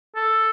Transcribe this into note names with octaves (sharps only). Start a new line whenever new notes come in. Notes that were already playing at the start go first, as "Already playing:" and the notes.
A4